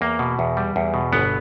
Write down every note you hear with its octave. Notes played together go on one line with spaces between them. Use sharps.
E2 A#3
B2
E2
G3
E2
B2
G1 B3